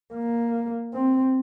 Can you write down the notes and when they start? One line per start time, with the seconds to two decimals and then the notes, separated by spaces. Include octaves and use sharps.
0.14 A#3
0.94 C4